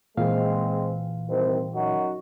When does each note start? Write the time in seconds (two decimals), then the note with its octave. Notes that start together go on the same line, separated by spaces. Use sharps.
0.17 A#2 E3 G#3 C4 F5
1.29 C2 D#3 C4
1.75 F#2 D#4 F#4